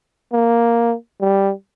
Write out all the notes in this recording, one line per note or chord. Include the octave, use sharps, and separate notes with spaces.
A#3
G3